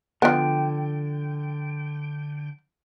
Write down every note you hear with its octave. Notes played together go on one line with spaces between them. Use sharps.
D3 F3 B3 G5